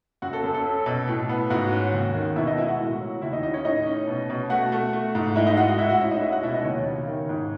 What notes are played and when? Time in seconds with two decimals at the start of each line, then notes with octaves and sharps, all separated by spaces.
0.22 F#2 F#4 F#5
0.33 A4
0.43 F#2 A4
0.54 A4
0.65 C#4
0.86 B2
1.08 A2
1.29 B3
1.50 G#2 F#4 F#5
1.72 C#4
1.93 D#2
2.15 D#3
2.36 B2 E4 E5
2.47 D#4 D#5
2.58 G#3 E4 E5
2.68 F#4 F#5
2.79 A2
3.01 F#3
3.21 D#2 E4 E5
3.33 D#4 D#5
3.43 C#4 D#4 D#5
3.54 C#4 C#5
3.65 A2 D#4 D#5
3.87 C#4
4.07 B2
4.30 B2
4.50 A3 F#4 F#5
4.72 A3
4.93 A3
5.15 G#2
5.36 G#3 E4 E5
5.47 D#4 D#5
5.57 G#3 F#4 F#5
5.68 F#4 F#5
5.78 A2 E4 E5
5.89 F#4 F#5
6.00 C#4 E4 E5
6.11 D#4 D#5
6.21 G#3 E4 E5
6.32 F#4 F#5
6.43 B2 E4 E5
6.54 D#4 D#5
6.64 D#2 C#4 C#5
6.86 C#3
7.07 D#3
7.29 G#2